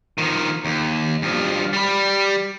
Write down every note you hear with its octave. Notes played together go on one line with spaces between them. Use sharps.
D#3 F3
D#2
G2 F3
G3 B5